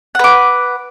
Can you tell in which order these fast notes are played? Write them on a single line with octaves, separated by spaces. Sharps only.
F#5 B4 D6